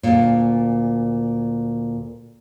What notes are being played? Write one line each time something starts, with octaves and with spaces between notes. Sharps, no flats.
D2 A#2